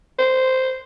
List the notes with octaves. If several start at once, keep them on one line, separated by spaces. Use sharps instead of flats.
C5